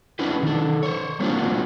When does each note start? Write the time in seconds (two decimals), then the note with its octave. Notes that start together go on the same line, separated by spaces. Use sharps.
0.19 C#4 D4 E4 F#4 B4 C5
0.43 D#3 A4
0.83 C5 C#5
1.20 G3 A#3 C4 D4 F4 F#4